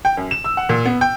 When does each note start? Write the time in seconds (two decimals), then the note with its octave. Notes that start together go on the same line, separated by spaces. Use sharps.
0.05 G5
0.17 F#2
0.31 E7
0.44 E6
0.57 F#5
0.69 A#2
0.86 B3
1.01 G5